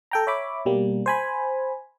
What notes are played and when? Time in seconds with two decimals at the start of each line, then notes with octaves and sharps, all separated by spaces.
0.11 A4 G5 A#5
0.27 C#5 E5 B5 D6
0.66 B2 G3 A#3
1.06 C5 G#5 B5